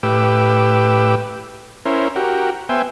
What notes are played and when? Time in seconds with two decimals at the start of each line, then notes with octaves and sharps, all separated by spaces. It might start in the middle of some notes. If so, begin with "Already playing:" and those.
0.03 A2 G4 B4 D6 E6
1.85 C#4 E4 A#4 C5
2.16 F#4 G4 A#4
2.69 B3 C5 E5 G5 G#5